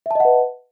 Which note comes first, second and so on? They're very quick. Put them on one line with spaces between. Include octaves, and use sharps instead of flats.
E5 A5 D#5 F#5 B4